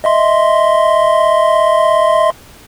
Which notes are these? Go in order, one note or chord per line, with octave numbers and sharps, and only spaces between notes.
D#5 E5 C6